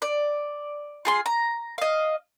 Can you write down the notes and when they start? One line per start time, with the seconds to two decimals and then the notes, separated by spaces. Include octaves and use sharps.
0.02 D5
1.05 F4 G#4 C6
1.26 A#5
1.78 D#5 F5